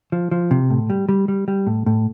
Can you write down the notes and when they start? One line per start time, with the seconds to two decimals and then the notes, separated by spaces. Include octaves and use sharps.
0.12 F3
0.31 F3
0.51 C3
0.70 A2
0.90 G3
1.09 G3
1.28 G3
1.48 G3
1.67 A2
1.86 A2